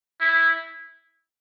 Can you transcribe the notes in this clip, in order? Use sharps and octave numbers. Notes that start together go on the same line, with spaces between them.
E4